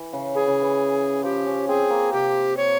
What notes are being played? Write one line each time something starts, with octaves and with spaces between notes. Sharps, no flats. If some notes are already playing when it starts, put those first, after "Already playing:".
Already playing: E3
C#3
E3 G#4
C#3
E3
F3 G4
C#4
C4 G#4
A#3
C3 G4
C#5